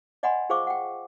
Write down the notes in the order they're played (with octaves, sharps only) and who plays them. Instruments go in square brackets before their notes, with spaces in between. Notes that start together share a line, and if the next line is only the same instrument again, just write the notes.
[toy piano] D5 D#5 F#5 G#5 B5 C6
F4 G#4 C5 F5 C#6 D6
F#5 G5